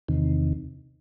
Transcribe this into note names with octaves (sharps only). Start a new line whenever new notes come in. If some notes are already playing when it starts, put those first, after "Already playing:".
E2 C3 D#3